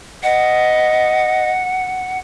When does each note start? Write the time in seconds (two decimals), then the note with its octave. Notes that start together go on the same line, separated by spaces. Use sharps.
0.23 D#5 F#5